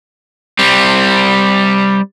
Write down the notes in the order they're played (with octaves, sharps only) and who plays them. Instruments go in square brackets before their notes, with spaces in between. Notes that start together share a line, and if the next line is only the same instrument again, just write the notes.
[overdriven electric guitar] G3 C4